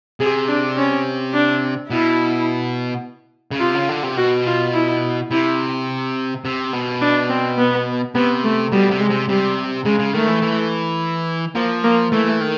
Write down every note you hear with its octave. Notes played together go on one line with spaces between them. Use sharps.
C3 G#4
D4
C#4
D4
B2 E4
C#3
C3 F4
C#3
D3
C3
B2 F#4
F4
E4
C3 E4
C3
B2
D4
C4
B3
C3 B3
A3
B2 G3
C3
G#3
C3
C3 G3
C#3 G#3
C#3
D#3 A3
E3
E3
F3 A#3
A#3
E3 A3
D#3